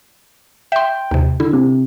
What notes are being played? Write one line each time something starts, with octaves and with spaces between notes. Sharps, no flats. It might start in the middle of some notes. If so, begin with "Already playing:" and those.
E5 G5 C6
D#2 C3
D3 E4
C3